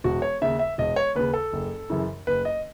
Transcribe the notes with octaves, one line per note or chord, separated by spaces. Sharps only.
E1 F#4
C#5
D#2 C#3 E5
E5
E1 D#5
C#5
D#2 C#3 B4
A4
F#1
F#2 C#3 E3
F#1 B4
D#5